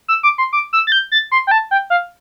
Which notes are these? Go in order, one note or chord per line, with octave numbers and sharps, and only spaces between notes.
E6
D6
C6
D6
E6
A6
G6
A6
C6
G5
A5
G5
F5